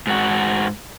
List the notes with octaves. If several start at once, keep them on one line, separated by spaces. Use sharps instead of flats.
G#2 F#4